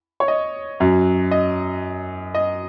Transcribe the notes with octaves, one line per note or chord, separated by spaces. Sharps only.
C#5
D#5
F#2 F#3
D#5
D#5